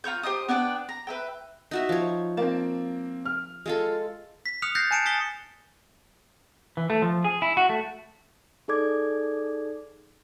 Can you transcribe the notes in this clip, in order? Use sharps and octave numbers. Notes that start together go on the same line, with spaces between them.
F4 A#5 C#6 G6
G4 C5 D#5 D#6
B3 D4 D5 G5
A#5
B4 E5 G5
D#4 F#4 E5
F3 C#5
A#3 C4 A5
F6
G#3 F4 A4
B6
D#6 F6 F#6 C#7 F7
F#6 G6 A6 A#6 C7
G#5 A5 C#7 D7 E7
D#6 A6 B6 C#7 G7
E3
A3
F3
G#4
E4
F#4
A3
D#4 G#4 A4 D5 D6 G#6